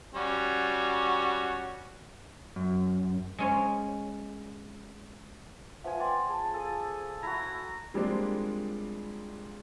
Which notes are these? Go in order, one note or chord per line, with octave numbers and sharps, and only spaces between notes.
G3 C#4 F#4
F#2
G#3 C#4 C#5
F3 B4 E5 F#5 G#5
D5 F#5 G5 C6
G#4 A5
A4 G#5 D#6
E4 F#4 A#5
F3 G3 G#3 A#3 C4 D4